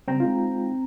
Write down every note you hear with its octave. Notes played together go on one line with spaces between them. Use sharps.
C#3 G3 C4 G5 A#5
G#3 D#4 F4